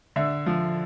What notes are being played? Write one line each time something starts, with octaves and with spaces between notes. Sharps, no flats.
D3 E5
F3